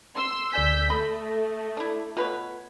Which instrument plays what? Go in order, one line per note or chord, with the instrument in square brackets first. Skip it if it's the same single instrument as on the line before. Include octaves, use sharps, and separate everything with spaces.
[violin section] C6 E6
[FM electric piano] D2 D5 G#5 [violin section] E6 G6 B6
[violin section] A3 [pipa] B5 [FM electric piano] D#6 A#6
[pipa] D4 E4
[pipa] B2 B4 C#5 [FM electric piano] F4